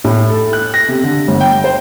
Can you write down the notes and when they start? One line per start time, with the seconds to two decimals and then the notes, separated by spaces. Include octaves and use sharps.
0.04 A2
0.30 A4
0.53 F#6
0.74 A#6
0.88 C3
1.03 D3
1.28 G1
1.40 G5
1.64 C5